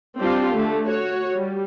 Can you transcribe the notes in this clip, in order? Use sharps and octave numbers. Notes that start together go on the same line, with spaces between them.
G3 C4 D4 F4 G4
D3 A3
F#4 C#5
G3